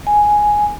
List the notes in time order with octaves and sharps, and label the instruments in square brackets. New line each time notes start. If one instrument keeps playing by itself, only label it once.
[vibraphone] G#5